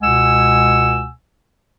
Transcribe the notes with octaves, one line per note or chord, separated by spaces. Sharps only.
C#2 B2 G#3 F#5 G#5 E6